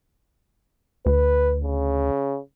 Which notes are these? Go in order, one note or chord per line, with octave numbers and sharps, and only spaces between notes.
D2 B4
C#3